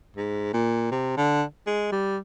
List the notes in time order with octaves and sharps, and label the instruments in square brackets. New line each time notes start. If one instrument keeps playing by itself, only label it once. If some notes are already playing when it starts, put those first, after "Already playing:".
[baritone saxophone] G#2
A#2
C3
D3
G#3
G3